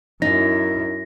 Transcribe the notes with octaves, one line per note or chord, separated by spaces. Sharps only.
F#2 D#4 E4 A#6